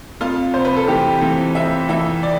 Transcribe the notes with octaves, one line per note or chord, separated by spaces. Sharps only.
F2 F4
C3 C5
B4
A4
E3 G4
E3
F2 E5
E3 E5
D5